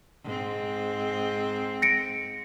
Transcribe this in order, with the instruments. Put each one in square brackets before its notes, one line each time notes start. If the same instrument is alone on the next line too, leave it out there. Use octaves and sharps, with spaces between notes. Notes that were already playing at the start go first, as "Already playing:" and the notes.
[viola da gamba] G#2 C4
[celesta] A#6 C#7 D7